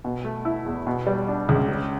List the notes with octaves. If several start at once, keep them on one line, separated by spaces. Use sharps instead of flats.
B2
A3
E4
E2
B2
G3
D4
C#2
C#3